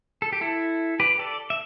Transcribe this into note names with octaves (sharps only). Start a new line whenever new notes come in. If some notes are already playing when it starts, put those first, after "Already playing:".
A4
G4
E4 A4
G4 B4
A4 D5
E5